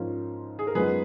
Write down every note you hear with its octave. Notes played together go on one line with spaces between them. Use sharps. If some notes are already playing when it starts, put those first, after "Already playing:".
Already playing: G#2 F3 A#3 C#4 F4
G#4
A#4
F#2 F3 G#3 B3 D#4 G#4 B4